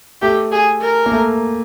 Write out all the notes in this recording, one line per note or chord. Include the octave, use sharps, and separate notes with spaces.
A3 G4
G#4
A#4
A#3
A3